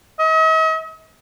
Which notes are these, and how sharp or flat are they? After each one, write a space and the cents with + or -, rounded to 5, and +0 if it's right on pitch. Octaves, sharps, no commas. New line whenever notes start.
D#5 +45